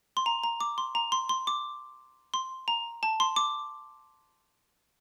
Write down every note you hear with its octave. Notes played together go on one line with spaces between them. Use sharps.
C6
A#5
A#5
D6
C6
A#5
C6
C6
D6
C6
A#5
A5
C6
D6